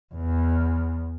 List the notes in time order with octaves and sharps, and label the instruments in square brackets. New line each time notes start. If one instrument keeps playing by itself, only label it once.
[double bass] E2